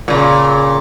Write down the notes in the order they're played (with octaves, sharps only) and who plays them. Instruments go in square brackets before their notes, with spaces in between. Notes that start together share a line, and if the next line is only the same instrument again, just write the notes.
[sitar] A#2 C#3